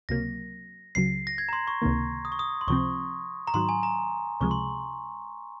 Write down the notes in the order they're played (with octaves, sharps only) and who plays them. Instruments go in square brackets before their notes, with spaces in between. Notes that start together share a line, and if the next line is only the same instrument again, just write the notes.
[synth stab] C#2 C3 F#3 A#3 [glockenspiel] A#6
[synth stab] C#2 C#3 F#3 [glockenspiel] C7
[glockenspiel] A#6
G#6
A#5
C6
C#6
[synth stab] C#2 C3 D#3 A#3
[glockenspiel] D#6
C#6
D#6
C6
[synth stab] C#2 C3 F3 C4 [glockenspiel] C#6
[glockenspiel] A#5
[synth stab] G#2 D#3 F#3 [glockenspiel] C6
[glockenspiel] G#5
A#5
[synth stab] C#2 C3 F3 G#3 [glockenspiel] C#6
[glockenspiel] C6